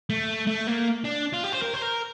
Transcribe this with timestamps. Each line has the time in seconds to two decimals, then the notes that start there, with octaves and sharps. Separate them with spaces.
0.10 A3
0.47 A3
0.67 A#3
1.05 D4
1.33 F4
1.44 G4
1.53 C5
1.62 A#4
1.74 C5
1.82 A#4